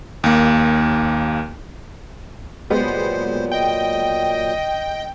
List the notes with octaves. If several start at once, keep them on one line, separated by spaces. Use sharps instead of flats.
D#2 A#3
A#2 F#3 G#3 B3 G4 C5
D#5 G5